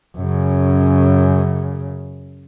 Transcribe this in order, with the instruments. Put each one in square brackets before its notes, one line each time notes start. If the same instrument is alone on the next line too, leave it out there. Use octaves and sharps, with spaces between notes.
[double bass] F#2 C#3